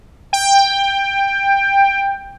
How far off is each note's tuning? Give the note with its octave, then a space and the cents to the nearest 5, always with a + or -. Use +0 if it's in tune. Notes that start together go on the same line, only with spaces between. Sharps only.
G5 +15